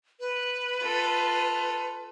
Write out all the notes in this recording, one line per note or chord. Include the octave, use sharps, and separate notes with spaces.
B4
F4 A4